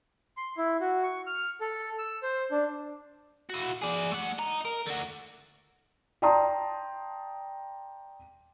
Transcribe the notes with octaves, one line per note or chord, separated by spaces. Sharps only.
C6
E4
F#4
C#6
F6
A4
E6
C5
D4
E4 F#4
G#4 D5
A3 F#5
D#5 A#5
A#4
D3 F#4
D5 G5 A5 A#5 C6 D#6